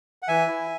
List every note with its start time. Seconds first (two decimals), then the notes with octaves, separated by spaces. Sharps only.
0.22 F#5
0.28 E3 E5 G#5
0.47 E4